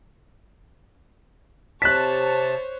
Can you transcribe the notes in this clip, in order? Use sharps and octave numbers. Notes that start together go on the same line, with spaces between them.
C3 C5 C#5 A5 F#6 B6